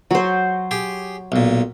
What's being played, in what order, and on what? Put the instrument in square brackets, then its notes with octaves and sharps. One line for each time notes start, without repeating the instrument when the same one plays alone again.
[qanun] F#3 C5
[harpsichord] G4 G#4
B1 A#2